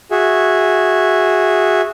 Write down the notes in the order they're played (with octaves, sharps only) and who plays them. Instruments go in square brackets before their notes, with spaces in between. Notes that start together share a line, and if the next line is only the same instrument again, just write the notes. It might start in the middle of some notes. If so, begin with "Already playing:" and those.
[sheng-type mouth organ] F#4 G#4 E5